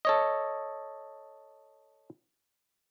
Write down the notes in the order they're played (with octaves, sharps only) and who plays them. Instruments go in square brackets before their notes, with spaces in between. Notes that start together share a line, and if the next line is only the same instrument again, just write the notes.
[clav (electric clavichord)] A4 C#5 D#5